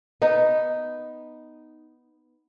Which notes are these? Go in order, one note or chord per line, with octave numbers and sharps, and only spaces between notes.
B3 D#4